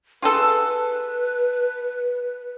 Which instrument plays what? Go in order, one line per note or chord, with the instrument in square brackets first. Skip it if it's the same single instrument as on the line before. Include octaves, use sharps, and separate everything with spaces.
[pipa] F4 G#4 A4 [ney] B4